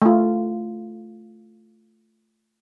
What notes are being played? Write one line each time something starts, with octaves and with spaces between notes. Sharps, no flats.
A3 F4